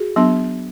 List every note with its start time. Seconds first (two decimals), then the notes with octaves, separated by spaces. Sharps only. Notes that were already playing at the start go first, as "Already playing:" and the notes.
Already playing: F#4 G#4
0.16 F#3 B3 D4